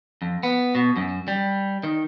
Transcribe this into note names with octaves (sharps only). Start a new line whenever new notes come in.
F2
B3
B2
F#2
G3
D#3